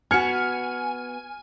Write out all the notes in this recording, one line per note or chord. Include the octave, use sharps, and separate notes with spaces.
B3 F#4 G#5 F6 C#7